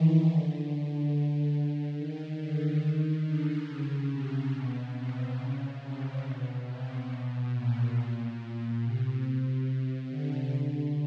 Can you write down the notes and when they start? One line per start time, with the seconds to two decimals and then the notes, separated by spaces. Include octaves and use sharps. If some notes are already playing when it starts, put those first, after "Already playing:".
Already playing: D#3 E3
0.27 D3
0.70 D3
1.55 D3
1.98 D#3
2.40 D3
2.84 D#3
3.26 D3
3.69 C#3
4.12 C3
4.55 B2
4.97 C3
5.40 C#3
5.84 C3
6.26 B2
6.68 C3
7.11 B2
7.55 A#2
8.83 C3
10.10 D3
10.54 D3